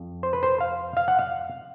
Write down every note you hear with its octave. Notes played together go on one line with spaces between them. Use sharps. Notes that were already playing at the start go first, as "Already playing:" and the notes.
Already playing: F2
C5
B4
C5
F5
F5
F#5
F5